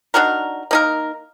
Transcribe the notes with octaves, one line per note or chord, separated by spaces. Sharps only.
D4 D#4 F#4 A#4
A#3 D#4 A#4